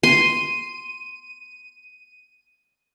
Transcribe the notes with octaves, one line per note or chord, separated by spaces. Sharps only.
C6 D#7